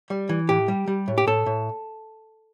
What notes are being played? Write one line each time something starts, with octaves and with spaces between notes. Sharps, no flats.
G3
E3
A2 G4
G3
G3
A2
G4
A2 A4
A2